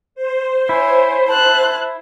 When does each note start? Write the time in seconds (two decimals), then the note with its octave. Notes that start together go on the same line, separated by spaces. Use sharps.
0.15 C5
0.69 E4 C#5 G#5
1.29 A5 F#6